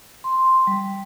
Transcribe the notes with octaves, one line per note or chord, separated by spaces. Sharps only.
C6
G3